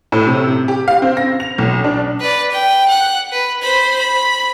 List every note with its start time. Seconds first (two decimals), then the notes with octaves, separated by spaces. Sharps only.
0.12 A2
0.27 C3
0.68 G4
0.88 F5
1.02 C4
1.17 A#6
1.40 F7
1.58 B1
1.84 D4
2.20 B4 D5
2.51 G5
2.88 F#5
3.32 B4
3.62 C5 B5
3.99 B5